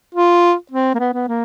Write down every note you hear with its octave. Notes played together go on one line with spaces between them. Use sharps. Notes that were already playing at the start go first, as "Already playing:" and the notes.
F4
C4
A#3
B3
B3
A#3